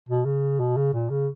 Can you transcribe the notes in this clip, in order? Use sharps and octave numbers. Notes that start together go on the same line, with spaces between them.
B2
C#3
B2
C#3
A#2
C#3